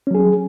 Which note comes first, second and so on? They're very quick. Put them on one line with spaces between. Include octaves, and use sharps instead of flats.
C#4 F#3 G#4